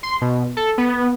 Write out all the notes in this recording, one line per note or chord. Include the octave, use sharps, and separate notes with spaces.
C6
B2
A4
B3